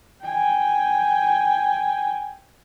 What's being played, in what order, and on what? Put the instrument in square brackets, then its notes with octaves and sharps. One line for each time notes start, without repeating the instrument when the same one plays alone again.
[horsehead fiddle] G5 G#5